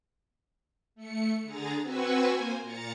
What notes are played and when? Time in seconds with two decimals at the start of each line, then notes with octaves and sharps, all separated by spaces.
0.95 A3 C#7
1.43 D3 G#4 A#5 A6
1.81 C4 F#4 B4 G#5 C#6 E6
2.29 A#3 C5 G#5
2.61 A#2 A#5 A6 C#7